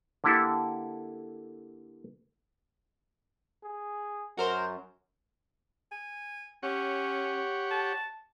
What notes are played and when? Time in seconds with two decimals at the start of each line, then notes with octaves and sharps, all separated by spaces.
0.24 D3 A#3 E4 G4 A4
3.64 G#4
4.37 F#2 F#4 A#4 C5
5.92 G#5
6.63 C#4 G4 C#5 F#5
7.71 A5